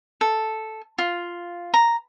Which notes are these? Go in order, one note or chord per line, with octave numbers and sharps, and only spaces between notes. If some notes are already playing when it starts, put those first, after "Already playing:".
A4
F4
A#5